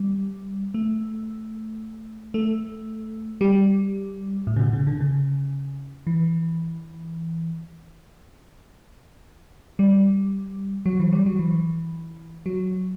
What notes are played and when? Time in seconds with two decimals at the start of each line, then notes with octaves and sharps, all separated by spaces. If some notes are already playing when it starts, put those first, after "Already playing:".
Already playing: G3
0.74 A3
2.34 A3
3.41 G3
4.47 A2
4.56 C#3
4.60 B2
4.73 C#3
4.87 D3
5.00 C#3
6.07 E3
9.79 G3
10.86 F#3
11.00 E3
11.13 G3
11.26 F#3
11.39 E3
12.46 F#3